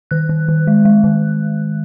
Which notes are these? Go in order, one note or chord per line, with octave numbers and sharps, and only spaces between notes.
D#3 F#6
D#3
D#3
G#3
G#3
D#3